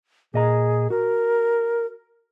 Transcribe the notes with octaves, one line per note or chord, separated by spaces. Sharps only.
A#2 G#4 D#5 A#5
F#4 A#4